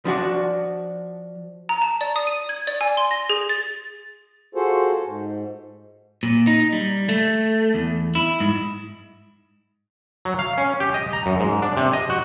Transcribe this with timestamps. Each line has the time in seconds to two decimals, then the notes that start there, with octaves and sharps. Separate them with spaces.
0.05 F3 D4 F#4 D5
1.69 A#5
1.82 A5
2.01 D5
2.16 D#6
2.27 D#7
2.49 G#6
2.67 D5
2.81 G#5
2.97 C6
3.11 A#6
3.29 G#4
3.49 A6
4.55 F4 F#4 G#4 A4 C5
5.06 G#2
6.23 A#2
6.47 D#4
6.73 G3
7.09 A3
7.74 E2
8.15 E4
8.40 G#2
10.25 F#3
10.39 F5
10.58 C#4
10.80 G4
10.94 D#5
11.13 A#5
11.26 F#2
11.40 G#2
11.62 D4
11.77 C3
11.93 D#5
12.10 F#4